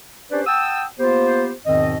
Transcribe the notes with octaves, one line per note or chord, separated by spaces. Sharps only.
C#4 D4 G4 B4 C5 D5
F#5 G5 A5 D#6 E6
A#3 B3 F4 G4 C5
E2 G#2 B2 D#3 C4 D#5